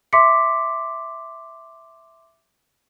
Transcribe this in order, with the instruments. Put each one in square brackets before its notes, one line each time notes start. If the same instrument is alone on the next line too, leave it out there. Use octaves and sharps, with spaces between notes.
[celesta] E5 C6 D6 B6 C#7